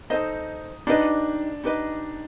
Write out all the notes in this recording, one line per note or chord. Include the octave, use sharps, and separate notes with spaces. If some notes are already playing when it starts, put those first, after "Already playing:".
D#4 A4 C5 D#5
D4 D#4 G4 B4 D#5
D#4 G4 B4 D#5